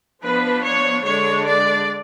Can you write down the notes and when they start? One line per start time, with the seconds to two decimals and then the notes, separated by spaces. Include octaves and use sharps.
0.21 F3 B3 D4 B4
0.63 C#5
1.03 D3 G#3 D4 C#5
1.44 D5